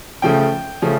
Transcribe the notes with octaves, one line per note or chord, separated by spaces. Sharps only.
C#3 F3 A3 C#4 G5
C#3 F3 A3 C#4